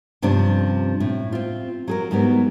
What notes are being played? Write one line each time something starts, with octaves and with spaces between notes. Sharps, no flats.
G2 C3 F3 C#4 D4
A2
C4 F4
F#3 G#4 A#4
G#2 F#3 G3 B3 A#4